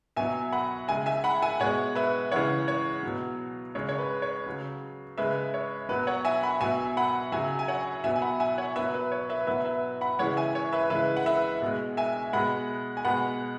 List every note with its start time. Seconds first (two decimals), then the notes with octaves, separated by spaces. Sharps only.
0.16 B2 F#3 E5 G#5
0.52 F#5 B5
0.88 C#3 G#3 E5 G#5
1.06 E5 G#5
1.24 F#5 B5
1.42 E5 G#5
1.60 B2 G#3 C#5 F#5
1.95 B4 E5
2.32 C#3 E3 G#3 C#5 F#5
2.68 C#5
3.03 B2 F#3
3.75 C#3 G#3 C#5
3.89 C#5
3.98 B4
4.22 C#5
4.46 C#3 F#3
5.18 C#3 G#3 B4 E5
5.54 C#5
5.89 B2 F#3 B4
6.07 C#5 F#5
6.25 E5 G#5
6.43 F#5 B5
6.61 B2 F#3 E5 G#5
6.97 F#5 B5
7.32 C#3 F#3 E5 G#5
7.59 G#5
7.68 C#5 F#5
8.04 B2 F#3 E5 G#5
8.16 G#5
8.22 F#5 B5
8.40 E5 G#5
8.58 C#5 F#5
8.76 B2 F#3 B4 E5
8.94 B4
9.12 C#5
9.29 B4 E5
9.47 B2 F#3 B4 E5
9.65 B4 E5
10.01 F#5 B5
10.19 C#3 E3 G#3 C#5 F#5
10.37 E5 G#5
10.55 C#5
10.73 B4 E5
10.90 C#3 E3 G#3 B4 E5
11.16 F#5
11.26 B4 E5
11.62 B2 G#3
11.97 E5 G#5
12.33 B2 G#3 F#5 B5
12.97 G#5
13.05 B2 G#3 F#5 B5